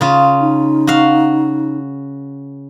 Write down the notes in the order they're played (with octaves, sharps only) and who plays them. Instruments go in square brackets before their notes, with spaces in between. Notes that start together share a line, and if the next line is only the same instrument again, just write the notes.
[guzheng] C#3 F4
[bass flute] D#4
[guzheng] F#4 F5